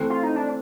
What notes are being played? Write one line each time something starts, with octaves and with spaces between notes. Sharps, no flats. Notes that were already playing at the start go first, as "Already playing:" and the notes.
Already playing: E3 A3 C4
F4
D#4
D4